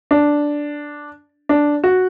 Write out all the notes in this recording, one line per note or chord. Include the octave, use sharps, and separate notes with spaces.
D4
D4
F#4